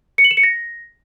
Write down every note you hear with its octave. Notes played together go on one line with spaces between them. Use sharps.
C#7
F#7
E7
C#7
A#6